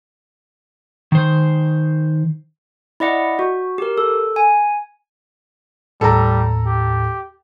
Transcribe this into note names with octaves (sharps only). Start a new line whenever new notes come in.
D#3 C5
E4 D5 D#5 F#5
F#4
G4 A#4
A4
G#5
D#2 A2 G3 A4 A#5
G4